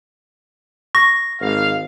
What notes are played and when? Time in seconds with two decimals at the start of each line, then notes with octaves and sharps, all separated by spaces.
0.95 C#6 A#6
1.41 G#1 F5